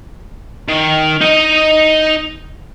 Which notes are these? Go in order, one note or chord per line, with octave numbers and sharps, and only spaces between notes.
D#3
D#4 D#5